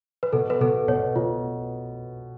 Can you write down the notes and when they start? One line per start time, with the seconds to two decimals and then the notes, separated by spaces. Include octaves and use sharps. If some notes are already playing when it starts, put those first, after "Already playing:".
0.23 B4
0.33 B2 A4
0.50 B4
0.61 B2 A4
0.88 B2 C#5
1.16 B2 F4